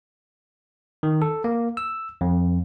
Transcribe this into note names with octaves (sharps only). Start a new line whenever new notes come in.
D#3
A4
A#3
E6
F2